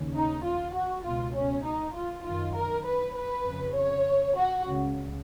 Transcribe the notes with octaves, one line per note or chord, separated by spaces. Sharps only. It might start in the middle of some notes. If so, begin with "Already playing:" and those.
Already playing: D#2 C#3
D#4
F4
F#4
C#2 B2 F4
C#4
D#4
F4
F#2 D#3 F4
A#4
B4
B4
F2 C#3
C#5
F#4
C#2 C#3